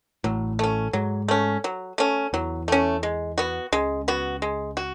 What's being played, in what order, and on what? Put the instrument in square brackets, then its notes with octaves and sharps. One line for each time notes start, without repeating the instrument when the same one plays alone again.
[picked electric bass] A1 A2 [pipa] F#3
[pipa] A3 C#4
[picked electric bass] G#2 G#3 [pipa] F#3
[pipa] A3 C#4
F#3
A3 C#4
[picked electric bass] E2 E3 [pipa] F#3
[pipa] A3 C#4
G#3
B3 F#4
[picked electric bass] C#2 C#3 [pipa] G#3
[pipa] B3 F#4
G#3
F#4